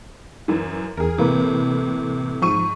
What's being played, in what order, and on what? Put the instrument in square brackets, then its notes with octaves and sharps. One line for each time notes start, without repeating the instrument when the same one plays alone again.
[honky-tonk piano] F#2 E3
[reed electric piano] E2 [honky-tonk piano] G#4 A#4
[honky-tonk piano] A2 C3 [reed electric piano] E3 A#3 B4
[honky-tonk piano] G#2 C#6 D#7 [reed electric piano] F3